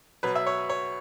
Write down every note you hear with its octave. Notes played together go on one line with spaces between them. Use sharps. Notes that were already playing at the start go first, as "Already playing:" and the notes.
B2 F#3 B4
E5
C#5
C#5